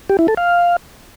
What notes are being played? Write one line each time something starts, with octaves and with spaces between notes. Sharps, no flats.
G4
E4
A4
F5